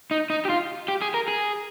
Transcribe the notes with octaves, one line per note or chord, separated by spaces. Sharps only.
D#4
D#4
G4
F4
G4
G#4
A#4
G#4